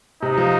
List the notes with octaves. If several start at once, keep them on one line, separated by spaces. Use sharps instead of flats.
C3 D#4
F3